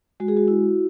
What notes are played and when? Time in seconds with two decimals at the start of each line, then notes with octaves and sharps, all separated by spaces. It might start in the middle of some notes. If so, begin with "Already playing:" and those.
0.20 G#3 F#4
0.28 G#4
0.37 F#4
0.48 E4